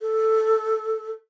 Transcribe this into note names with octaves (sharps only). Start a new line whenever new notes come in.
A4